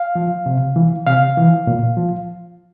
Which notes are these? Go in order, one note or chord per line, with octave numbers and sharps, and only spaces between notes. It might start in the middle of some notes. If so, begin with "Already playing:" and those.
Already playing: F5
F3
C3
E3
C3 F5
E3
A#2
F3